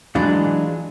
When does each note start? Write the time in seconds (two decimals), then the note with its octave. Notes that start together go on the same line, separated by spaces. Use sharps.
0.15 E3 F#3 G#3 D4 F4